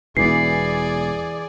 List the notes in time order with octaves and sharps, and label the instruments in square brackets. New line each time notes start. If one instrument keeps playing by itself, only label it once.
[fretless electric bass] E1 B3 [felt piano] E3 [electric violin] G#4 D5 [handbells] C7